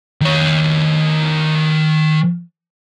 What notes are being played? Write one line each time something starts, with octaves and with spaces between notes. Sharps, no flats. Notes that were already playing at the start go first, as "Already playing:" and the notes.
D#3 C#5